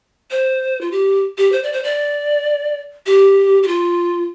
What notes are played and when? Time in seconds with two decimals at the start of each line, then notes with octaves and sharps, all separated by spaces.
0.31 C5
0.81 F4
0.92 G4
1.38 G4
1.52 C5
1.63 D5
1.73 C5
1.84 D5
3.06 G4
3.63 G4
3.67 F4